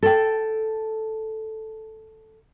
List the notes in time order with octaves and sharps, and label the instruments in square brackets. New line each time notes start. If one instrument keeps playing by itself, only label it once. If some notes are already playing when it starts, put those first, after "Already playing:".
[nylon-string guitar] A4 G5